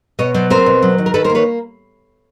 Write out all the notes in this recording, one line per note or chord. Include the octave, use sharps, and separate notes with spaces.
B2 C#5 D#5
F#3 C5 D5
C4 A#4 C5
B2
F#3
D#3
A#4
D#3 A4 B4
A#4 C5
A#3
B4 C#5